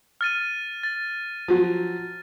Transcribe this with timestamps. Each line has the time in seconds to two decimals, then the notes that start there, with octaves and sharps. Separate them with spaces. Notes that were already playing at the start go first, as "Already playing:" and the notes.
0.21 F6 A6 D#7
0.83 A6
1.48 F3 F#3